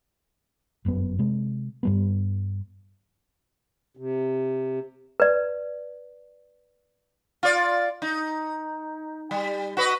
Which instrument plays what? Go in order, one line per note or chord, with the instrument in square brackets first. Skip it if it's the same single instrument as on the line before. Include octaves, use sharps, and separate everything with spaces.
[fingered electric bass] G1 F#2 A#2 B3
C3 G#3
G2 G3 B3
[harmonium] C3
[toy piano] B4 D5
[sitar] F4 D5
D#4
G3
F#4 B4 D#5